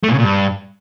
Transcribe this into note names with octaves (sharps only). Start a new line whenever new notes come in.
A3
A#2
C#3
A#2
G2